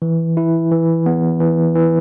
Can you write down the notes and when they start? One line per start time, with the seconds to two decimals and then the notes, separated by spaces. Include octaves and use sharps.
0.02 E3
0.37 E4
0.72 E3
1.06 B3
1.40 E3
1.75 E3